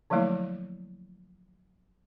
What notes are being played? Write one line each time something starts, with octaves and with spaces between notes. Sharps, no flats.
D3 F3 F#3 A3 A#3 E4